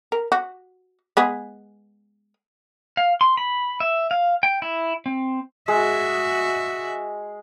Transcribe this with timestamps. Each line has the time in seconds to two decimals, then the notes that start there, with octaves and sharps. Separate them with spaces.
0.12 A#4
0.32 F#4
1.17 G#3 B3 G#4
2.97 F5
3.21 C6
3.37 B5
3.80 E5
4.11 F5
4.43 G5
4.62 E4
5.06 C4
5.68 G#3 F#4 E5